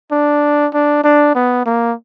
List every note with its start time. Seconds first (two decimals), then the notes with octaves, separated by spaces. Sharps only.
0.12 D4
0.74 D4
1.04 D4
1.35 B3
1.66 A#3